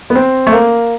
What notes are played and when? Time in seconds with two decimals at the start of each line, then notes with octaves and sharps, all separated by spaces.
0.10 B3
0.15 C4
0.47 A3
0.52 A#3